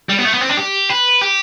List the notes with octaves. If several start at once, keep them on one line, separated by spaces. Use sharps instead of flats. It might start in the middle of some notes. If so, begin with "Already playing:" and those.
G3
B3
A3
B3
C4
D4
G4
B4
G4